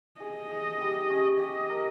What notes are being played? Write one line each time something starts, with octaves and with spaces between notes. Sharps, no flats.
G#4 D#5
G#4
G3
C#4
G4 D#5
A#4